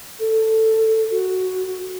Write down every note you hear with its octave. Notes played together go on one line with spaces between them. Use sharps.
A4
F#4